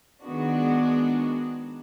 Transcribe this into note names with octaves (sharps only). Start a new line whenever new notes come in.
D#3 G#3 B3 D4 F#4